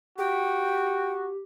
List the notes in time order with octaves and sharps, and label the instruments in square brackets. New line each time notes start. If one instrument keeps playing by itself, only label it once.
[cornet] F#4 [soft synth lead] G4 [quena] G5